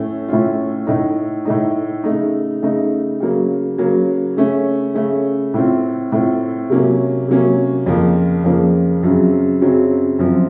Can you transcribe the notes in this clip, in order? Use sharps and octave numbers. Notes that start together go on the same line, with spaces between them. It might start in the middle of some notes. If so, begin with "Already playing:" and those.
Already playing: A2 A3 C#4
A2 A3 C#4 F4
A2 A3 D#4
A2 A3 D#4
C#3 A3 D#4
C#3 A3 D#4
C#3 F#3 A#3
C#3 F#3 A#3
C#3 A3 C#4
C#3 A3 C#4
A2 A3 C4 F4
A2 A3 C4 F4
C3 F#3 A#3 C#4
C3 F#3 A#3 C#4
F2 C#3 F3 A#3
F2 C#3 F3 A#3
F#2 C#3 F#3 C4
F#2 C#3 F#3 C4
F#2 F3 C4